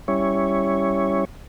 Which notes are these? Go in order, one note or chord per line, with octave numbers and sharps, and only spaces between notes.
G3 C#4 E4 C#5